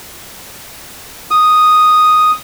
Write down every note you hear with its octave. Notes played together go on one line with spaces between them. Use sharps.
D#6